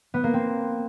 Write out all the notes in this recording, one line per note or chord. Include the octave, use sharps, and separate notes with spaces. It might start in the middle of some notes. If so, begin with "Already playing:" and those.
B3
A#3
C4